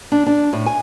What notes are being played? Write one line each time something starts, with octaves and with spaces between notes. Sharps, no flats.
D4
D4
A2
G#5